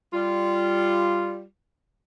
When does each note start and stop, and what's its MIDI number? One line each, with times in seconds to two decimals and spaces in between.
0.13 1.42 55
0.13 1.42 65